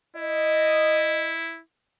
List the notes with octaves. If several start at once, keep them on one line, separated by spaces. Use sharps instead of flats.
E4 D#5